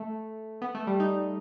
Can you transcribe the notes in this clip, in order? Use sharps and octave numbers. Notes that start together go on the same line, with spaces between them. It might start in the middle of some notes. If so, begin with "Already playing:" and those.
Already playing: A3
B3
A3
G3
D#4